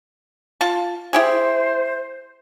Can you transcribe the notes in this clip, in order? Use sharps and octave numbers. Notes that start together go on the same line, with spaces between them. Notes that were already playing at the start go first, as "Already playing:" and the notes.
F4 A5
E4 G4 G#4 C5